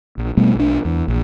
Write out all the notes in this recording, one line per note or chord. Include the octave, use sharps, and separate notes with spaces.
A#1
B2 G3 A3 B3
B1 D4
E2
A#1